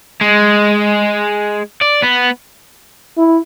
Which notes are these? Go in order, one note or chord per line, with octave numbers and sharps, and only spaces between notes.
G#3
D5
B3
E4